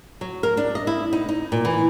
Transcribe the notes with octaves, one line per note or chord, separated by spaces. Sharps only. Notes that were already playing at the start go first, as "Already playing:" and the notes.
F#3
A#4
D4
D#5
E4
D#4
D#4
A#2
E3